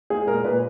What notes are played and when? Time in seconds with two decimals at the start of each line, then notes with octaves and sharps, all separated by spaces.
0.10 G#3 G#4
0.27 A#2 A#4
0.44 A#2 B4